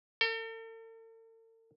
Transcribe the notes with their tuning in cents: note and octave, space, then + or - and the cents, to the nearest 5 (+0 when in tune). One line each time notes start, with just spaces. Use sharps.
A4 +45